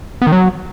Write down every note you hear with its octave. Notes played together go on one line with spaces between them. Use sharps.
B3
D#3
F#3